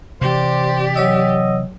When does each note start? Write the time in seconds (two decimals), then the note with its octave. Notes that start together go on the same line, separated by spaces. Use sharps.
0.21 C3 E3 G4 C5 D5
0.95 F#3 C#5 D#5 E6